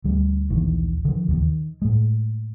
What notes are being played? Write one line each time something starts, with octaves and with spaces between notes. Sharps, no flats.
D2 G3
A#1 D#2 D#3 E3
D3 F3
D#2 D3 D#3
D#3
A2 G#3